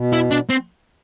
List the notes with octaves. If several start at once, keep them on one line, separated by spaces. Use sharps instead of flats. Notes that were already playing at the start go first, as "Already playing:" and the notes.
Already playing: B2
E4
D4
C4